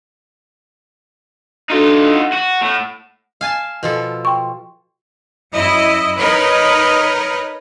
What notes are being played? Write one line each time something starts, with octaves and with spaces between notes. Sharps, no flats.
D4 D#4 F4 F#4 A4
F#5
F#4
A2
F5 G#5 A5
B2 F3 A4
G5 C6 C#6
F#2 E4 D#5 E5
D#4 A#4 B4 C#5 D#5